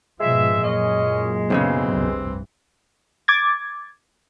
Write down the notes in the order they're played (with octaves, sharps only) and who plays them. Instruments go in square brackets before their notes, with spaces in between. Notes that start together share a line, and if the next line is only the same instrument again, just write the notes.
[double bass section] G#2 B2 F3 [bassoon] G#3 [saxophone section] E5
[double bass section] F#2 A#2 [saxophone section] C#4 D#5
[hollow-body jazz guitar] B1 A2 C#3 [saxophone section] E3 C4
[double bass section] F1 C2 G2
[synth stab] D6 G#6 A6